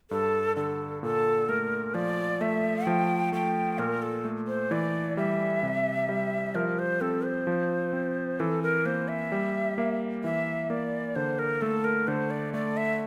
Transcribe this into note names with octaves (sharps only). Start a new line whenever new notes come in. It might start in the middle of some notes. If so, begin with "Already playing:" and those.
G2 A4
D3 A4
A#2 A4
A3 A#4
F3 D5
A3 E5
F3 G5
A3 G5
A#2 A#4
A4
A3
C5
E3 D5
G3 E5
C3
G3
F3 A#4
C5
C4 A4
C5
F3
C4
E3 A4
A#4
A#3 C5
E5
G3
A#3
E3 E5
A#3 D5
D3 C5
A#4
A3 A4
A#4
D3 C5
D5
A3 D5
E5